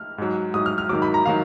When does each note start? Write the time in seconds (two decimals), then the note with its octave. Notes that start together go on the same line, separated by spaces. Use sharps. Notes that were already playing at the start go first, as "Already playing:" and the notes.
Already playing: F6
0.18 G#2 F#3
0.54 G#2 F#3 D#6
0.66 F6
0.78 F6
0.89 G#2 D#3 F#3 D6
1.02 B5
1.14 A#5
1.25 D#3 F#3 F5